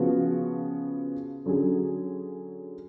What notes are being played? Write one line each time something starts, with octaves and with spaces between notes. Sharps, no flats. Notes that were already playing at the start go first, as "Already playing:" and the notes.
Already playing: C#3 F3 B3 F#4
D3 F#3 C#4 G#4